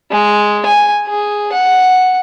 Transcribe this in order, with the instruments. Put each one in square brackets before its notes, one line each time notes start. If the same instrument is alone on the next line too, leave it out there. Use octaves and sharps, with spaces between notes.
[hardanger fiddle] G#3
G#5
G#4
F#5